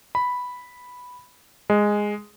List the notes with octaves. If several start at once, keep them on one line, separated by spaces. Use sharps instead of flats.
B5
G#3